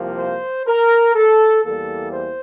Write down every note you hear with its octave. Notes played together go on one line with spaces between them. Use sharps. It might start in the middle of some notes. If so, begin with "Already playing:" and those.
Already playing: C2 C3 F3 A#3
C5
A#4
A4
E2 E3 G3 A#3 A4
C5